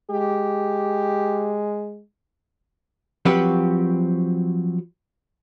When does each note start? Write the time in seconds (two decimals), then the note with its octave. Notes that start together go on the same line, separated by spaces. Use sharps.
0.11 G#3 G4
3.25 F3 F#3 C4 F#4 G4 B4